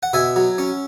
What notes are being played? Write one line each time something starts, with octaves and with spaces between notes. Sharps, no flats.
F#5
B2 E5 G#5
F#3
C#4